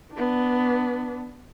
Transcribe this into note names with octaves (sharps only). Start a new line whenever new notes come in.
B3 D4